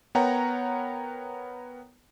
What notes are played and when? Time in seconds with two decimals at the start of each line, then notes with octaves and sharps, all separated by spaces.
0.15 B3 A#4 C#5 F#5 G5 A#5